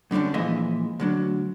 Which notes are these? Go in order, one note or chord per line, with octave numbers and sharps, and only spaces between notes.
F#2 D3 G3 C#4 D4
A#2 E3 F3 G#3 D#5 E5
D2 F#3 D4